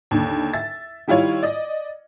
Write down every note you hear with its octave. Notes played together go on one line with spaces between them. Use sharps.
D#2 D3
E5 A6
D#3 G3 E4 F4 C#5
D5 D#5